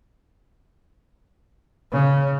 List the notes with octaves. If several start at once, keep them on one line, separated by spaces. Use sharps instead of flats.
C#3